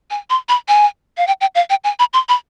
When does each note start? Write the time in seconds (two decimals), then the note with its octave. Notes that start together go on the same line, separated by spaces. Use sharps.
0.11 G#5
0.30 C6
0.49 B5
0.68 G#5
1.17 F5
1.27 G5
1.41 G5
1.55 F5
1.70 G5
1.84 G#5
1.99 B5
2.13 C6
2.29 B5